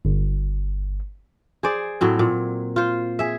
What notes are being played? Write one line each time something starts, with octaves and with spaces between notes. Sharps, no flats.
G1
G#4 C5 D5
A2 F#3 C4
A#2
F4 C5
G#4 E5